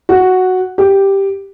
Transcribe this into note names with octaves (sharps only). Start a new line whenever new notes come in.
F#4
G4